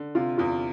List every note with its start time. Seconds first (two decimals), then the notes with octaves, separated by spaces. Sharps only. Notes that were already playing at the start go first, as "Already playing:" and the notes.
Already playing: D3
0.15 C3 F4
0.38 E2 F4